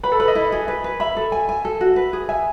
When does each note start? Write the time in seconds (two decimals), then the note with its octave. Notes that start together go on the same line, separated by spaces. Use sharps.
0.03 B4 B5
0.12 A4
0.20 B4 B5
0.28 D#5
0.35 E4
0.52 G#4
0.68 B4
0.84 B4
1.00 E5 B5
1.17 A4
1.32 G#5
1.49 G#5
1.65 A4
1.81 F#4
1.96 B4
2.13 G#4
2.29 E5 G#5